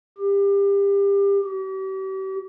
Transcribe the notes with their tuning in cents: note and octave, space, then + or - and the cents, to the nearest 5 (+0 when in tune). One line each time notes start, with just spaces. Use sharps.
G4 +30
G4 -40